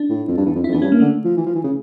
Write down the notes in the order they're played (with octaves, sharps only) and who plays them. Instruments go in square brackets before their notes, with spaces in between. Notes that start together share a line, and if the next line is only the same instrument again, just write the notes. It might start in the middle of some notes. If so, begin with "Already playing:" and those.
Already playing: [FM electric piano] D4
[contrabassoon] A2
F2
G2
E2
F2
[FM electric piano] E4
[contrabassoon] F2
[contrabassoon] E2 [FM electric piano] D4
[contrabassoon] G2 [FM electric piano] C#4
[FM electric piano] A#3
[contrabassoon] D3 [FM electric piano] A3
[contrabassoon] F3
E3
F3
E3
C#3